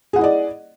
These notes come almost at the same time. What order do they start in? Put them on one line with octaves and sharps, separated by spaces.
G#4 F#5 E4 D#5 D5